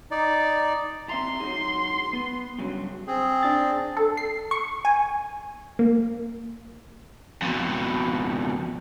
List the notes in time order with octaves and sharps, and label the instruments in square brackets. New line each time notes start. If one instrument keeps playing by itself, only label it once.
[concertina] D#4 D5
[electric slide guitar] C4 E5 A#5 [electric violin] C6
[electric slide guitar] F#3 D#4 G#4
B3
G2 C#3 F#3
[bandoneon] C4 G#4
[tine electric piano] D4 A6
[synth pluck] A4
C7
C#6
G#5
A#3
[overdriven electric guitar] F2 B2